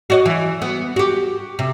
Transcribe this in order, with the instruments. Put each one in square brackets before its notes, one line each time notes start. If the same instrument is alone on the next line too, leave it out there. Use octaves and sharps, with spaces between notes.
[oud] F#4 D5 D#5
E3
B3
F#4 G4
C3